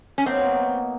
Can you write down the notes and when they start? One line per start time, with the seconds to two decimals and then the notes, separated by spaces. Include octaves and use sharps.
0.18 C#4
0.26 B2 F#3 A#3 C4 D#4